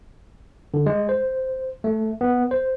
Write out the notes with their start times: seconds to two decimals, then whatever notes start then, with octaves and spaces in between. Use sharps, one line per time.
0.74 D3
0.86 G#3
1.09 C5
1.84 A3
2.21 B3
2.51 C5